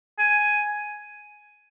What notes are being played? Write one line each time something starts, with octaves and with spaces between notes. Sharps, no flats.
G#5